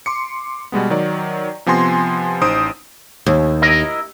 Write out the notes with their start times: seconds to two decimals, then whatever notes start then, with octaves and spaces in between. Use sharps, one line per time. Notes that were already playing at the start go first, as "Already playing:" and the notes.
0.06 C6 D6 C#7
0.72 B2 G3 G#3 B3
0.90 D#3 F#3 D5
1.66 C3 F3 B3 G#5 C6 A#6
2.42 A1 D#4 C5 D#6 D7
3.26 D#2
3.62 E4 A#4 D#5